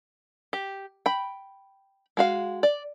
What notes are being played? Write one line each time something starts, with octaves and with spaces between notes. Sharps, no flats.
G4
G5 B5
G#3 F#4 F5
D5